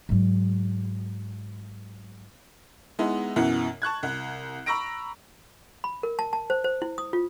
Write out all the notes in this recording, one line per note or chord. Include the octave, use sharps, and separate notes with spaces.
G#2 F#3
G#3 B3 D#4 E4
F#2 B2 E3 E4 F#5
A5 C#6 F#6 G#6
C2
A#5 B5 C#6 E6 A#6 D7
B5
A#4
A5
A5
C5
C5
E4
D#6
F4